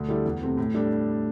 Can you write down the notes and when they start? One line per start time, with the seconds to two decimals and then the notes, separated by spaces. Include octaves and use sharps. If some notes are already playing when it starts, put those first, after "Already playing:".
Already playing: D2
0.08 D3 G3 E4 A4
0.25 E2
0.42 C3 A3 C4
0.57 A2
0.74 G3 D4 A4